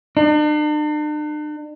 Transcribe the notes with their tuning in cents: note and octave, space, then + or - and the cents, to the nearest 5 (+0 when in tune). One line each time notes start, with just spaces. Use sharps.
D4 +45